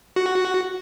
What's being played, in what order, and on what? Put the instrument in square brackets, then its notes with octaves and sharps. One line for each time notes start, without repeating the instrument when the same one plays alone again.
[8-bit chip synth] F#4